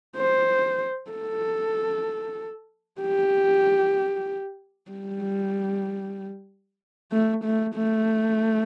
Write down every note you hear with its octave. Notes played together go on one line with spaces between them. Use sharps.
C5
A4
G4
G3
A3
A3
A3